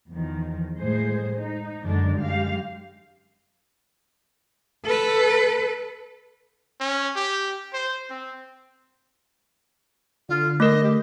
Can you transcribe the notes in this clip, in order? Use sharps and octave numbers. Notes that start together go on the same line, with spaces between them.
E2 D#3 F3
A2 G#3 G#4 C5
D#4
F#2 D3 D#3 G#3 D4 D5
F#2 G#3 G4 F5
A4 B4
C#4
G4
C5
C4
D3 F4
A3 A#4 D#5
G4